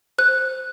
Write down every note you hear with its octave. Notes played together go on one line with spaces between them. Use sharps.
C5 F#6